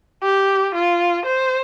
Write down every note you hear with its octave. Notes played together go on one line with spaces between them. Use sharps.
G4
F4
C5